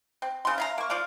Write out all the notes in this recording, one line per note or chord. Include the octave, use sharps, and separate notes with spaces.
C4
C#3 C6
E5 F5 A#5
A#3 C#6
F3 C5 D5 F5